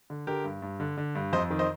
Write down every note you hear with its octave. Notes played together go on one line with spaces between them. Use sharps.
D3
D3 G4 A#4
G2
G2
D3
D3
G2
F2 C5 D#5
D#3
C5 D#5